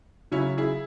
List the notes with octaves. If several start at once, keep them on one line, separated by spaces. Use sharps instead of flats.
C#3 F#3 C#4 E4
E4 G#4